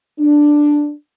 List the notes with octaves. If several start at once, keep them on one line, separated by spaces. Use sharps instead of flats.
D4